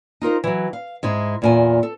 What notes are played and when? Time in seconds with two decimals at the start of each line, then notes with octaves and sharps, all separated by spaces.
0.22 D#4 F4 A#4 C5
0.44 E3 F#3
0.73 F5
1.03 G#2 G#3 E4
1.42 E2 A#2 G#5
1.83 A4